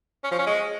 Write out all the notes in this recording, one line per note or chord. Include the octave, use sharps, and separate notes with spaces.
C#4
F3
C#4
G#3